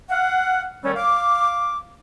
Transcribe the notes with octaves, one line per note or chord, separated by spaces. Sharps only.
F5 F#5
D#3 G3 A3 C#4
F5 D6